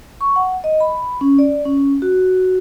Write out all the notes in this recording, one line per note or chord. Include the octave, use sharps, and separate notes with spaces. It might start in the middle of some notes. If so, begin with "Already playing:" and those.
C#6
F#5
D#5
B5
C#4
D5
C#4
F#4